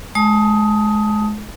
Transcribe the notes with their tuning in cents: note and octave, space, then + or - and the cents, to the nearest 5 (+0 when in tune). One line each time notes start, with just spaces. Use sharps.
G#3 +30 A5 +0 D#6 +15